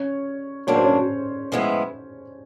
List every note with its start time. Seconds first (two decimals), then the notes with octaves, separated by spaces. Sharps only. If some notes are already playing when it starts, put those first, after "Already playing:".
Already playing: C#4 C#5
0.67 A2 F#3 A#3 D4 F#4 C#5
0.75 C5
0.84 C#4 C#5
1.52 A2 F3 G#3 B3 E4